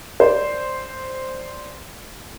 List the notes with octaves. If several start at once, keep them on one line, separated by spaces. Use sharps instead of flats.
C5 D5